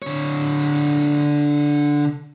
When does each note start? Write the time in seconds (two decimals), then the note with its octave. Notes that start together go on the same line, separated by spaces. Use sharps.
0.02 D3 C#5